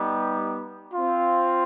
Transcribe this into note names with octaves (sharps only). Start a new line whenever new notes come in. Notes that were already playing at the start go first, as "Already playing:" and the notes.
Already playing: G3 B3 D#4 G4
C4 F4